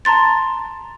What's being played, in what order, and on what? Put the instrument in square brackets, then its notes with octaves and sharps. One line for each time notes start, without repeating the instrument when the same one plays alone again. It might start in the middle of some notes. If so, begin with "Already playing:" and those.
[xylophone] A5 A#5 C6 A6